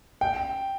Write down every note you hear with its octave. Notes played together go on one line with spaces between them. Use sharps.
G5